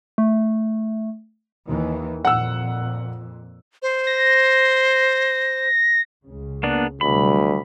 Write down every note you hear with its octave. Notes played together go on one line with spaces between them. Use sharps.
A3
D#2 D#3 E3
F2 A#2 F#5 E6
C5
A#6
C#2 C#3
A#3 B3 D4
D2 C3 F#3 G3 B5